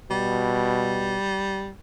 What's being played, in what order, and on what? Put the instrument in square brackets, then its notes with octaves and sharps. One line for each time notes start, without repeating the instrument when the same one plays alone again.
[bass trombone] B2 [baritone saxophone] G3